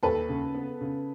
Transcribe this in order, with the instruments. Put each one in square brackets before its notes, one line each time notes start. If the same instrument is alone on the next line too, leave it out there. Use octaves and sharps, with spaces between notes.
[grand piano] D#2 [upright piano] A4 B4
[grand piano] C#3
B3
C#3